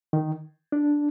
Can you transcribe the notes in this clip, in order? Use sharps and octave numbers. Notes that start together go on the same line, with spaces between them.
D#3
D4